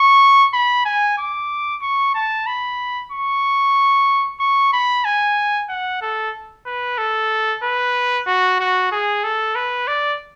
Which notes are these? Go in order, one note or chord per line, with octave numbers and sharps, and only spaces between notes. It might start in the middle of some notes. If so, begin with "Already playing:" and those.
Already playing: C#6
B5
G#5
D6
C#6
A5
B5
C#6
C#6
B5
G#5
F#5
A4
B4
A4
B4
F#4
F#4
G#4
A4
B4
D5